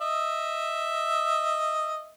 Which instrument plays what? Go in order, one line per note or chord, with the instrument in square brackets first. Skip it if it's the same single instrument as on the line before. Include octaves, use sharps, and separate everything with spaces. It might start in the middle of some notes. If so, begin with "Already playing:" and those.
[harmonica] D#5 E5